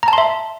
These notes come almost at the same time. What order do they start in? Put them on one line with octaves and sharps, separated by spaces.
A#5 A5 C6 E5